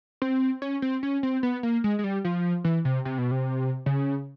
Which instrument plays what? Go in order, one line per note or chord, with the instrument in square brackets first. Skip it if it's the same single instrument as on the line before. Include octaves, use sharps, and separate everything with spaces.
[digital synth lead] C4
C#4
C4
C#4
C4
B3
A#3
G#3
G#3
G3
F3
E3
C3
C3
B2
C3
C#3